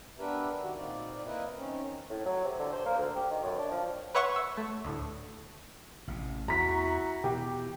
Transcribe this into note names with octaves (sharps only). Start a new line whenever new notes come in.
B3 D4 G4 A#4 B4 E5
D#3 F#4 G4
A#2 C4 D#4 F4 D5
A#3 E4 A#4 B4 D#5 E5
D#3 C4 C#4
A2
F#3
C3
D3
C5
A#3
D2
G4
D#3
F#2
D4
F3
B4 C#5 E5 F#5 C6 C#6
E6
A3
D2 A2
A1 C3
E2 E4 F#4 A#5 B6
B2 E3 G4